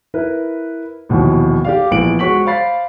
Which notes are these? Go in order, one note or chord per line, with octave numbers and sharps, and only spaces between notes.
E4 A#4 B4
A#1 D#2 B2 E3
G4 D5 F5
A#1 E3 F3 B3 D7 F#7
G#3 F#4 C#5 C#6 B6 F#7
C5 D5 F5 B5 A6 C7